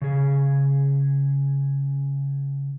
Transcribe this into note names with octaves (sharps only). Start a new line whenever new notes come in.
C#3 G#4